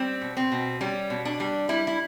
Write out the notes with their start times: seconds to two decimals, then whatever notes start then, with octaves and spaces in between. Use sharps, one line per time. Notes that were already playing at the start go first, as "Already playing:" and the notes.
Already playing: G3 C4
0.21 B2
0.37 C4
0.52 B2
0.81 G3 C#4
1.10 B2
1.25 D4
1.40 G3
1.69 G3 E4
1.87 E4